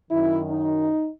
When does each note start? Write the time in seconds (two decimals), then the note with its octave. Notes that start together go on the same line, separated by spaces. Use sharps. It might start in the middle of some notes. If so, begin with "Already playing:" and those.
0.11 F#2 D#3 E4
0.51 D#4